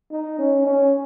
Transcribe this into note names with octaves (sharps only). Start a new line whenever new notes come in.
D#4
C#4
C#4